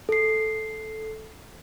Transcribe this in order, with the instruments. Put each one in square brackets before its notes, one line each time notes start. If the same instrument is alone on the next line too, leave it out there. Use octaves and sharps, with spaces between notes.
[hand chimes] A4 C7